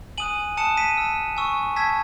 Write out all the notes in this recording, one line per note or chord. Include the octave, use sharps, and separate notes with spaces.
G#5 D#6 F#6 D#7 F#7
A5 D#6 F#6 C#7 E7
B6 D#7
A5 E6
G#5 C#6 E6
A5 E6 G#6 B6